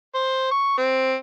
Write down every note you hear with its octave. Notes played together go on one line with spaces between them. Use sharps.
C5
C#6
C4